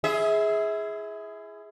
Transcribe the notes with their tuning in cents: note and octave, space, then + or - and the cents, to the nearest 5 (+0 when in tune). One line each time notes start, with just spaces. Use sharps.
E4 +35 G#4 +5 E5 -30